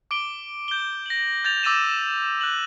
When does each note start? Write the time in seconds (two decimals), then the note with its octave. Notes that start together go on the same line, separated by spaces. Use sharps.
0.11 D6 D7 G7
0.68 G6 G7
1.06 A#6 F#7
1.45 G6 A6 F7
1.63 D6 E6 A6 A#6 D#7 E7
2.41 F#6 F#7